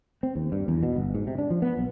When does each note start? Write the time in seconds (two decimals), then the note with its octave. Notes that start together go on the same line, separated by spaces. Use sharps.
0.23 C4
0.35 D#2
0.52 G2
0.68 E2
0.83 B2
0.96 G1
1.14 G#2
1.27 C3
1.38 D4
1.50 F3
1.62 B3
1.77 B1